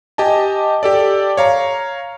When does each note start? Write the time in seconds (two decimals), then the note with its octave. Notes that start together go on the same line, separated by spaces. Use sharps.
0.18 G4 D#5 G#5 A5
0.83 G4 A4 D5
1.37 C#5 F5 A#5